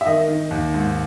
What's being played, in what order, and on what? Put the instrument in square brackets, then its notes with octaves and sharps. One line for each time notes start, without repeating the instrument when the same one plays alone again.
[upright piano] E5
D#3 D#5
D#3
D#2
G#2